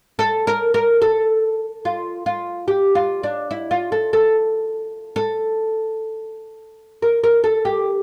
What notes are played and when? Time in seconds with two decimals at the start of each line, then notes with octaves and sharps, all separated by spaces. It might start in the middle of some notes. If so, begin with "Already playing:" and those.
0.19 A4
0.47 A#4
0.74 A#4
1.02 A4
1.85 F4
2.26 F4
2.68 G4
2.95 F4
3.24 D4
3.51 E4
3.71 F4
3.92 A4
4.13 A4
5.16 A4
7.02 A#4
7.24 A#4
7.44 A4
7.65 G4